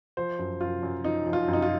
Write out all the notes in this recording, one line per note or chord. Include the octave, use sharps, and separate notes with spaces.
F3 C5
F#2
F#2 F4
F#2
F3 D#4
F3
F4
F#2
D#4
F4